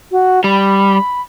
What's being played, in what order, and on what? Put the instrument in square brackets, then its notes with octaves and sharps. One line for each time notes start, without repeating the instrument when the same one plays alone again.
[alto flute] F#4
[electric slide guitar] G3 [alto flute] B5